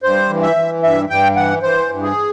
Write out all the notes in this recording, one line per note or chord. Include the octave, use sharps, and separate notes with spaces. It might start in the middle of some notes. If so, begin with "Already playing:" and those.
G2 C5
E3
E5
E3
G2 E5
G2 G5
E3 F#5
E3 C5
G2
G#4